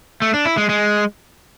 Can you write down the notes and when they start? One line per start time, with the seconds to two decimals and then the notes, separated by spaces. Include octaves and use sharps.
0.22 A3
0.34 D4
0.46 E4
0.57 G#3
0.69 G#3